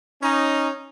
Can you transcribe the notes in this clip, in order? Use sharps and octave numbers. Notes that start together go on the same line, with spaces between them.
C#4 D#4